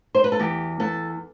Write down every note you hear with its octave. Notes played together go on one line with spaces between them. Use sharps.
C5
B4
A4
E2 G4
E2 A4